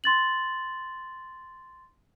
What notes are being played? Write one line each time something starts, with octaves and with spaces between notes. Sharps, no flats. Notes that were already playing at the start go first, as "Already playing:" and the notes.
C6 A6 F#7